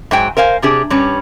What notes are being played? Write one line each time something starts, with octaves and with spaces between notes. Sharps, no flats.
G#2 F#3 G5 G#5
A#4 C5 F5 G#5
C3 D4 G4 G#4
G2 G3 C#4